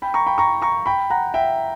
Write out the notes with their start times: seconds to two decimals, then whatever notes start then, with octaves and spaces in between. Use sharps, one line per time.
0.02 G5 B5
0.14 A#5 C#6
0.26 G5 B5
0.38 A#5 C#6
0.62 A#5 C#6
0.86 G5 B5
1.10 F#5 A#5
1.34 E5 G5